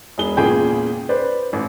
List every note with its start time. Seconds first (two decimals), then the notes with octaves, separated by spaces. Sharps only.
0.18 E1 G#4 G7
0.37 E2 A#2 C#3 G#4 G5 G6
1.09 B4 C5 D5
1.53 A1